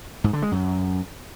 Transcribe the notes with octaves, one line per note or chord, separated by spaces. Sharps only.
G#2
D3
G#3
F#2